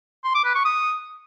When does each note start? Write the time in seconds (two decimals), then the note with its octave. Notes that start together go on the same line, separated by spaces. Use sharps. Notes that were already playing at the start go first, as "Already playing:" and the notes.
0.24 C6
0.35 D6
0.45 B4
0.55 C#6
0.65 D#6